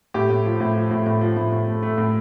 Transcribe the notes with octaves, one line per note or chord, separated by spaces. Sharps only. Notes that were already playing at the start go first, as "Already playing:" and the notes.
A2 G4
A2
F3
A2
F3
A2
A2
F3
A2
A2
A3
A3
A2